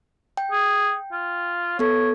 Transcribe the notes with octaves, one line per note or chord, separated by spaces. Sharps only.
G5
G#4
F4
B3 A4 C#5